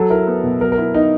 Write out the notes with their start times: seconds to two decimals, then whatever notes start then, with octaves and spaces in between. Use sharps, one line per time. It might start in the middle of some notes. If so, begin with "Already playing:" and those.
Already playing: F#3 A4
0.10 E4 A#4
0.27 B3
0.44 B2
0.60 F#3 A#4
0.72 A#4
0.78 E4
0.94 B3 D#4